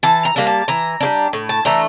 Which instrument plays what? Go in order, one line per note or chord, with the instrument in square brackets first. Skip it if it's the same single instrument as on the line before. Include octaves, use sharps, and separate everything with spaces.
[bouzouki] E3 A5
A#5
G3 A#3 D4
A5
E3 A#5
G3 A#3 D4
A2
A5
E3 A3 D4 A#5